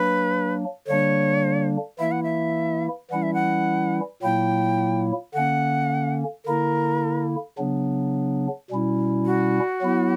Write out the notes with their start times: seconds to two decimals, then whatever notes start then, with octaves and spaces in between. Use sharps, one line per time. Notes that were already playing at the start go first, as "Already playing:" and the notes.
Already playing: F#3 A#3 D4 B4
0.87 D3 G3 A#3 D4 C#5
1.99 E3 A#3 E4 E5
2.12 F#5
2.23 E5
3.11 E3 G3 C#4 E4 F#5
3.23 E5
3.34 F#5
4.22 A#2 F#3 A#3 E4 G5
5.34 D3 A#3 C#4 F#5
6.45 D3 A#3 E4 A#4
7.58 C#3 F#3 B3 D4
8.70 B2 G3 C#4 E4
9.26 F#4
9.81 F#3 B3 E4